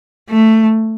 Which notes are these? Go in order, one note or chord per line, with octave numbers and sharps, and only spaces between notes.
A3